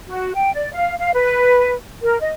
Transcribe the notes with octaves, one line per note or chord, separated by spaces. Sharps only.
F#4
G5
D5
F5
F5
B4
A#4
D#5